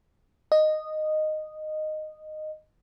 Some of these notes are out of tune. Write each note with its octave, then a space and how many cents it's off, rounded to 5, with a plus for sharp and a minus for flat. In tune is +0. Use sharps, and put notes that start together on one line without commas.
D#5 -10